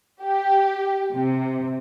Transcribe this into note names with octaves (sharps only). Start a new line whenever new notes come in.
G4
C3